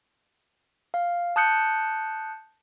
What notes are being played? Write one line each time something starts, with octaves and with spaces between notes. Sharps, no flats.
F5
A5 D#6 F#6 G6 C#7